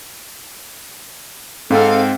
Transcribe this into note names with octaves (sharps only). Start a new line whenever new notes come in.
G#2 C4 A4 F5